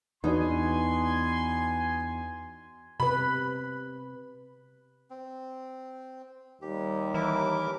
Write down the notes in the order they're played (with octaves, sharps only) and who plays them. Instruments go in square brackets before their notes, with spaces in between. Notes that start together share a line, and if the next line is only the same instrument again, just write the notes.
[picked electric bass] E2 [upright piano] B3 D4 F#4 [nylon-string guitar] D#4 [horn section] G#5 C6
[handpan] C3 B4 [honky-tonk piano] B5
[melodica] C4
[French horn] D#2 [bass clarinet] G3 [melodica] G4
[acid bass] E3 [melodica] E4 A#4 D6